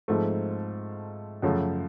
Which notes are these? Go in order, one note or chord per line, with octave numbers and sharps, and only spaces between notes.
G#2 F3 A3 C4
F#2 C#3 F3 A3